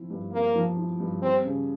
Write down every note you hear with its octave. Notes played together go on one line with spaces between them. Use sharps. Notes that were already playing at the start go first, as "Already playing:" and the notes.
Already playing: F3 C4 E4
G2
A#3 C4
F3
E4
G2
G3 C4
C#3